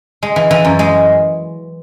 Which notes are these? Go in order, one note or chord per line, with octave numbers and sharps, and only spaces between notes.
G#3
E3
E3
F#2
G#3